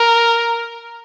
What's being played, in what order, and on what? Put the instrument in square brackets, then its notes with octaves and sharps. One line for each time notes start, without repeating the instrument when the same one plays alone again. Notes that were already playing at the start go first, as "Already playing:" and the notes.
Already playing: [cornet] A#4